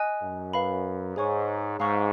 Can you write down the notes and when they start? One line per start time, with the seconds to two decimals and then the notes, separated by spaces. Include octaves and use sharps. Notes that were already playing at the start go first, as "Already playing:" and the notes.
Already playing: D#5 G#5 D#6 F#6
0.22 F#2
0.53 B4 F5 B5
1.16 G#2 G#4 C#5 G#5 C#6
1.79 G#2 F5 A#5 C#6 F6